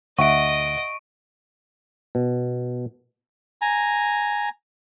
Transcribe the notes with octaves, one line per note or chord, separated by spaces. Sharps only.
D2 D#5 E5 F#5 C#6 D7
B2
G#5 A#5